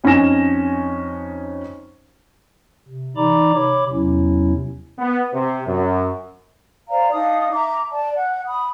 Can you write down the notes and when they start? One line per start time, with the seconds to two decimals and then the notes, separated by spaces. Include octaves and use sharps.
0.04 F2 C#4 D#4 G#5 A#6 E7
2.88 C3
3.17 E3 D#4 D5 A#5 B5 D6
3.54 C3 C#5 B5 D6
3.92 E2 C3 F#3 C#4 E4
4.99 B3
5.33 C3
5.66 F#2
6.89 C5 D5 F5 A#5
7.12 D4 D#4 F5 D#6
7.52 E5 A#5 D6
7.91 D5 A5
8.16 F#5
8.47 B5 D#6